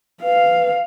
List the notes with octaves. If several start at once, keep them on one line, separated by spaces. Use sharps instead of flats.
B4 F5